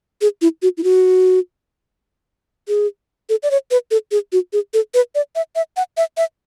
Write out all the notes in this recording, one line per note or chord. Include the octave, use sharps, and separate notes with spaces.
G#4
E4
F#4
E4
F#4
G#4
A4
D5
C#5
B4
A4
G#4
F#4
G#4
A4
B4
D5
E5
E5
F#5
E5
E5